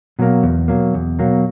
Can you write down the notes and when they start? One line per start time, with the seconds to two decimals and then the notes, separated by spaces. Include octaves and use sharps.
0.19 B2 F#3 A#3
0.43 E2
0.68 B2 F#3 A#3
0.94 E2
1.19 B2 F#3 A#3